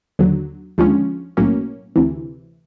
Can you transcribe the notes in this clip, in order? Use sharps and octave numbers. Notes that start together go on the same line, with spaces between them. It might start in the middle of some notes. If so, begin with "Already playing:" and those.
D#2 D3 F#3
D#2 D3 F3 G#3 C#4
B1 A2 F#3 A#3 C#4
D2 C3 E3